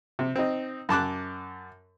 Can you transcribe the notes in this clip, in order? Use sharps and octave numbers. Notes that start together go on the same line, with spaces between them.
C3
C4 D#4
F#2 A5 D6 F#6